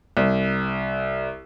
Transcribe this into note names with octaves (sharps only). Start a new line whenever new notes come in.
C2